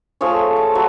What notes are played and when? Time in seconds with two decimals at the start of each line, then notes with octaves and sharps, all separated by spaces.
0.21 F3 A3 G#4 C#5
0.56 A5
0.75 F#3